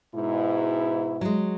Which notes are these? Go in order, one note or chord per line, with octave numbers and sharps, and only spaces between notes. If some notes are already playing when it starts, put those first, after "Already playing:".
G#2 B2 E4
F#3 G#3